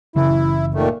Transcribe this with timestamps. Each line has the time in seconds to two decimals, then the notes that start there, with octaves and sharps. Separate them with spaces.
0.16 F#1 C#3 E3 E4
0.74 A#2 D#3 A3